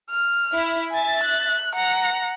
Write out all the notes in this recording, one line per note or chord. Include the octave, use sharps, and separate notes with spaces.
F6
E4
E5 G#5 A6
F#6
F#5 A#5 A#6 C#7